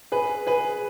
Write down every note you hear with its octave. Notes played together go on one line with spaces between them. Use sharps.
G#4 B4
G#4 B4